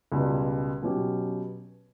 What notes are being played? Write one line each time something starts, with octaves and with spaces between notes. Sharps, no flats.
C#2 B2 G3
B2 F#3 C#4 G4